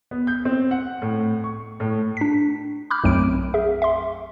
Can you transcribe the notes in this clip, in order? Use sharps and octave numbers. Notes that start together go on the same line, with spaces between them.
B3
G6
C4
F#5
A2
C#6
A2
D4 B6
B5 D6 F6 G6
B1 F#2 F#3 A3 C4 D7
G#4 E5
E5 C6